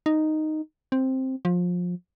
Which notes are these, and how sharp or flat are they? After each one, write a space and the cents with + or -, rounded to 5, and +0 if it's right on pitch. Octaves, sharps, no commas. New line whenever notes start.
D#4 -5
C4 +5
F3 +25